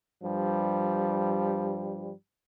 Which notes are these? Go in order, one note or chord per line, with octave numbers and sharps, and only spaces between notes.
G2 F3 G3